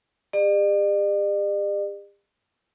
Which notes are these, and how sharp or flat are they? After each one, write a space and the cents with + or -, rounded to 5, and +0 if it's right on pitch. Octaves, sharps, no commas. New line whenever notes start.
G4 +45 D5 +45